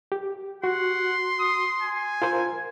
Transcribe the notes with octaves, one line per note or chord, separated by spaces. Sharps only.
G4
F#4 F#5 C6
D#6
G#5
F4 A#4 C5